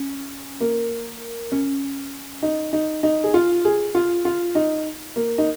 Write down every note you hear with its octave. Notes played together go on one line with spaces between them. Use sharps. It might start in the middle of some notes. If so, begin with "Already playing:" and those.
Already playing: C#4
A#3
C#4
D#4
D#4
D#4
G#4
F4
G#4
F4
F4
D#4
A#3
D#4